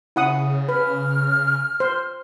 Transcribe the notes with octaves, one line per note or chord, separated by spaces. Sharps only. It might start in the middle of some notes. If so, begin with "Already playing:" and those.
C#3 E4 F#5 D#6
B4 F6
C5